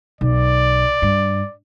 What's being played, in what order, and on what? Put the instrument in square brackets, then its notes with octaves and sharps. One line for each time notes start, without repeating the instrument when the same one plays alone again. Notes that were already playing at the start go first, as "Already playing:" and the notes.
[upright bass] B1 [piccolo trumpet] D5
[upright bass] G2